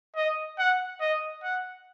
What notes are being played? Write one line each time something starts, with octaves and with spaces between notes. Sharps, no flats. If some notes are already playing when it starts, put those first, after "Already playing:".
D#5
F#5
D#5
F#5